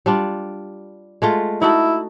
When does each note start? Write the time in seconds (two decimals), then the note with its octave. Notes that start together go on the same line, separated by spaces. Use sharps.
0.06 G3 D4 F4
1.22 G#3 A3 F4
1.62 D#4 E4 F#4 A4